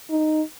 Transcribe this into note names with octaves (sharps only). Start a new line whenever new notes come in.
D#4